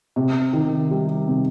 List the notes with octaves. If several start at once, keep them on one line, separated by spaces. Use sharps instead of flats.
C3
D#3
G3
C3